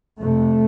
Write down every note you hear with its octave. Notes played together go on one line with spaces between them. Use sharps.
F2 C3 A3